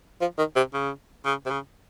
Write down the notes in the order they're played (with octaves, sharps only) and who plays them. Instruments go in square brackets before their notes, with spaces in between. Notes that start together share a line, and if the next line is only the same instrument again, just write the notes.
[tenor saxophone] F3
D#3
C3
C#3
C#3
C3
C#3